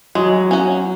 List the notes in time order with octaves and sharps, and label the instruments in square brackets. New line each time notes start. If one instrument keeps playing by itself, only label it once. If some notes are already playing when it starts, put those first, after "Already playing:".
[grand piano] F#3 [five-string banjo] G#3
[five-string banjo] C#4 F#4